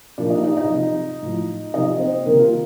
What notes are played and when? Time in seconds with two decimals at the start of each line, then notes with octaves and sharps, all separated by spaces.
0.18 A#2 F3 D4 D5
0.30 D#4 D#5
0.43 D#4 D#5
0.57 D#4 D#5
0.69 C3 F3
1.22 A2 F3
1.74 C3 F3 D#4 D#5
2.00 C4 C5
2.26 C3 D#3 A#3 A#4
2.39 F4